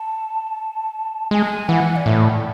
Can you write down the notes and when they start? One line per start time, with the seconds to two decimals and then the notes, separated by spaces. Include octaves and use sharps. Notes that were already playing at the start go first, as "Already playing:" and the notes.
Already playing: A5
1.31 G#3 G#5
1.69 E3 F#5
1.96 D5
2.06 A2 E5
2.25 D5